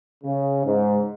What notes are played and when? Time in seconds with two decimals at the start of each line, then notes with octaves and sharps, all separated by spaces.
0.23 C#3
0.65 G#2